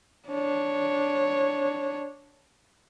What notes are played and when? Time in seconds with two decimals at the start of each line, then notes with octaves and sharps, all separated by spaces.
0.28 D4 C#5